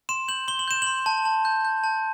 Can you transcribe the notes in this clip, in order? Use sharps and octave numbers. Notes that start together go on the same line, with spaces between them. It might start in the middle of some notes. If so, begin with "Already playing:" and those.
C6 E7
G6 F#7
C6 G7
F#7
G6 E7
C6 F#7
A5
A5
G6
G6
A5